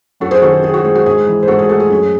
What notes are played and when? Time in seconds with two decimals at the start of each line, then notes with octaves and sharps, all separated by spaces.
0.20 F#2 F#4 A4
0.31 G#4 C5
0.42 D#3 F#4 A4
0.53 G#4
0.63 C4 G#4
0.74 F#4
0.84 G#3 G#4
0.95 F#4
1.06 G#2 G#4
1.27 E3
1.43 C5
1.48 G#2 F#4 A4
1.59 G#4
1.69 A3 F#4 A4
1.80 G#4
1.90 F#2 G#4